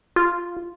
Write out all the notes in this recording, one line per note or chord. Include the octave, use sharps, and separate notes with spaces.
F4